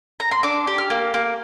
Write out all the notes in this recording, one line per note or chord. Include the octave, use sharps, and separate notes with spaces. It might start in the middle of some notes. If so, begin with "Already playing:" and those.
A#5
C6
D4 D6
G4
F6
A#3
A#3 D6